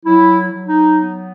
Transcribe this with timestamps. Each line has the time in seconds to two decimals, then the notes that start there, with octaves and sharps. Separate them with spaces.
0.06 F#3 E4
0.51 F#3
0.66 D#4
0.97 B3